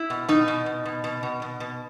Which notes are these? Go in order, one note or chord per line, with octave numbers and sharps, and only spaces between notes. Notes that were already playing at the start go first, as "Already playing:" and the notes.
Already playing: E4
B2
B2 D#4
B2
B2
B2
B2
B2
B2
B2